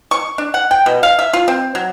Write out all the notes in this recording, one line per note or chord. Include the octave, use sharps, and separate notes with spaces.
C#6
D4
F#5
G5
B2
F5
E5
F4
C4
F#3